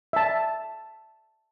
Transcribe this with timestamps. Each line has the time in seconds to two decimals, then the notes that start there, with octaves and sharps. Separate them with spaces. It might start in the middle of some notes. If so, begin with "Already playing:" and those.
0.13 E5 A5